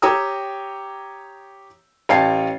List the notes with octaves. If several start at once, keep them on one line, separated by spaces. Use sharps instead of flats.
G4 C#5 G5 A#5 D#6 E6
A1 C#5 F5 G5 A5 C7